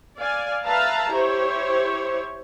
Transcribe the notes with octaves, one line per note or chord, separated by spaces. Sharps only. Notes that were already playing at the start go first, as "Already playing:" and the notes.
D5 F5 G#5
B4 E5 F5 A5 A#5
E4 G4 C5 C#5